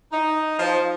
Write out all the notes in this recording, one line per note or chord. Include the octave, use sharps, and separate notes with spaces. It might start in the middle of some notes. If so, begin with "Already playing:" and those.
D#4
F3